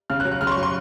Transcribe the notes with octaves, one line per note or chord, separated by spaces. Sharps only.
C#3 F6
F#6
F#3
F#6
C#3 F6
C6
C#6
F#3
C6